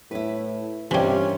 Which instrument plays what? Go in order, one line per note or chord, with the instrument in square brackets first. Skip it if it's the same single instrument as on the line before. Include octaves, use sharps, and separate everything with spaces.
[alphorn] A2 [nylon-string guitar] E4 B4
[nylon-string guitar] G2 A#3 [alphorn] C3 [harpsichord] E3 G3 [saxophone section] C#4 F4